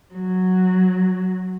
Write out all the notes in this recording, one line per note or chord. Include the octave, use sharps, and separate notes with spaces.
F#3